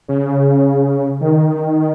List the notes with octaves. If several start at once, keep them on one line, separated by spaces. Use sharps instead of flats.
C#3
D#3